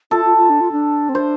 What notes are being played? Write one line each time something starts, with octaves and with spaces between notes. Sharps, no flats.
F4 A4
F4
F4
D4
F4
D4
C4
D4 C5